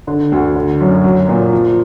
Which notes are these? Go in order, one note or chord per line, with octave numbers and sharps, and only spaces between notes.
D3
D2
D3
F#2
F#3
A#2
F3